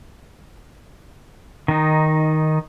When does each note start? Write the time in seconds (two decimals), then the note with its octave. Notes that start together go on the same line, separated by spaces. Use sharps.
1.68 D#3 D#4